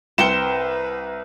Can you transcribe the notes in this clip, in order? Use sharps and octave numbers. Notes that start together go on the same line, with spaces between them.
C2 B4 C5 G5 C#7 E7 G7